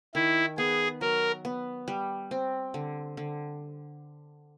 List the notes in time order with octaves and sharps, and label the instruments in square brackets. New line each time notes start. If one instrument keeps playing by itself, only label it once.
[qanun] D#3 [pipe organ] E4
[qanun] B3 [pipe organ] G#4
[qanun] F#3 [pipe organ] A#4
[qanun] B3
G3
C4
D3
D3